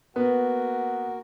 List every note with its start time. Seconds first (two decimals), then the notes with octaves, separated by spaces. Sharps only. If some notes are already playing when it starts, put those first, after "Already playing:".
0.16 A#3 B3 F#4 A#4 F#5